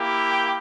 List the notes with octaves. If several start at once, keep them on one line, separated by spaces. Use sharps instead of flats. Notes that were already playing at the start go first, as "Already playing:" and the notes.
Already playing: A#3 E4 G4
G5